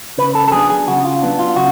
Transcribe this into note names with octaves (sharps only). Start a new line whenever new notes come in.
C#3 B4
A4
A4
F#3 B3 D4 G#4
G#4
C#3 F#4
F4
F#3 B3 D4
F4
C#3 F#4